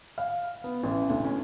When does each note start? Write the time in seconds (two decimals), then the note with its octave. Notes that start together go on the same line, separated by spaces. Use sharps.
0.18 F5
0.64 B3
0.83 A1
1.10 D2
1.24 C#4